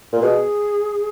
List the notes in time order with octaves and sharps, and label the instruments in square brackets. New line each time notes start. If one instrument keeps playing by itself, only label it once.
[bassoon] A#2
[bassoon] B2 [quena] G#4